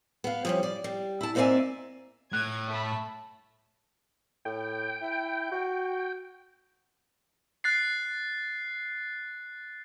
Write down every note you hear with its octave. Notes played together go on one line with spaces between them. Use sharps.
B3 F5
F3 G3 C#4
D5
G3
E4 A5
G#2 A#3 C4 D5 E5 G#5
A2 F#6 G#6
A3 A5 B5
A2 G5
E4
F#4
F#6 A6 C7